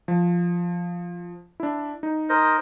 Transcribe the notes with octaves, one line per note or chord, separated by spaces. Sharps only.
F3
D4 E4
D#4
A#4 C5 D#5